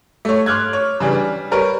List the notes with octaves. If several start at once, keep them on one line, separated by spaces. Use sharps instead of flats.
A3 C#5
C6 D6 F6 F#6 G#6
C#5
C#3 E3 G3 D4
G3
G3 A#4 B4 C#5